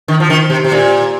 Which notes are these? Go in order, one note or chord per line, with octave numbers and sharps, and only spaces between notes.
D#3
F3
D#3
C3
C3
A#2